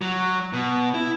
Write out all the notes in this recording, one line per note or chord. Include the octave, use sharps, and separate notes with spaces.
F#3
B2
E4